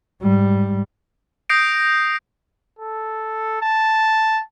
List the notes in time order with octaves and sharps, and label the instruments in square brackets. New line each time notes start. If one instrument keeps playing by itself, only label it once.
[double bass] G#2 G3
[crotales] D#6 G6 A#6 C7 D7
[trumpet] A4
A5